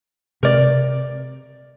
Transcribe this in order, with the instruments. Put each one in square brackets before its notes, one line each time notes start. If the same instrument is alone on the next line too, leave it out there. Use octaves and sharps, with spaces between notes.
[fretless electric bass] C3 [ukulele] A#4 D5